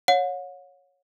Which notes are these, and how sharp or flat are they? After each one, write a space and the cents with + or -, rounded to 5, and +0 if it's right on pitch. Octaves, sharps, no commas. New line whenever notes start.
C#5 +0 F#5 -40